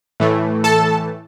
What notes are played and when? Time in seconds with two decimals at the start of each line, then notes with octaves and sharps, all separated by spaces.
0.20 A2 E3 A3
0.64 A4 A5